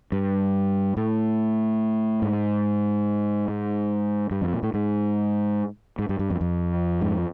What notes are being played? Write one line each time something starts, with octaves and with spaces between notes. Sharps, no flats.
G2
A2
G#2
G#2
G2
F2
A#2
A2
G#2
G#2
G2
G2
F2
F2
G#2